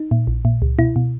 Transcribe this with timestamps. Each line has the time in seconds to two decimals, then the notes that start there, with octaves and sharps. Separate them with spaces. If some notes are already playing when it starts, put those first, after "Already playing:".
Already playing: D#4
0.11 A#2
0.27 A#1
0.45 A#2
0.62 C#2
0.79 B2 E4
0.96 B2